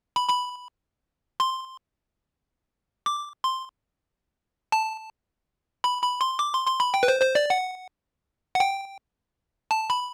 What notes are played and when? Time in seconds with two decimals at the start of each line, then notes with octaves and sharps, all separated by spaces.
0.16 B5
0.29 B5
1.40 C6
3.06 D6
3.43 C6
4.72 A5
5.84 B5
6.02 B5
6.21 C6
6.39 D6
6.53 C6
6.67 C6
6.80 B5
6.94 G5
7.03 B4
7.08 C5
7.22 C5
7.35 D5
7.50 F#5
8.55 F#5
8.60 G5
9.71 A5
9.90 B5